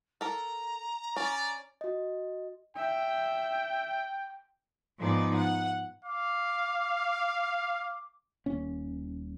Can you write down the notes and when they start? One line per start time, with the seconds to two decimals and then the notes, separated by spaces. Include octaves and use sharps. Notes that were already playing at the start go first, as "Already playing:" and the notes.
0.21 A4 A#4 A#5
1.16 C#4 D5
1.81 F#4 D#5
2.76 E5 G5
4.98 G#2 F3 B3 D#4 D5
5.35 F#5
6.04 F5 D6
8.46 D#1 A#3 C#4